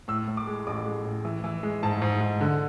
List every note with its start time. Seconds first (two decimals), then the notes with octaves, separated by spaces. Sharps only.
0.08 A2 E6
0.28 A2
0.37 D6
0.47 G#3
0.67 A1 D6
0.85 G#3
1.05 A2
1.25 E3
1.44 E3
1.63 G#3
1.83 G#2 A5
2.02 G#2
2.21 G#2
2.41 D3